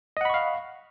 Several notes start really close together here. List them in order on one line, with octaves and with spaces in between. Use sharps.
D#5 F#5 B5 C#6 F5